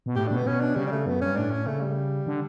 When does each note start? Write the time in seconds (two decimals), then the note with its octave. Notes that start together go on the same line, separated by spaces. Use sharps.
0.06 B2
0.16 A2 G4
0.27 B2 D4
0.36 B3
0.46 B2 C#4
0.61 D4
0.76 C#3 G3
0.87 G3
0.92 A3
1.06 F#2 B3
1.21 G2 C#4
1.36 A2 D4
1.51 C#4
1.66 C#3 A3
1.81 G3
2.27 D3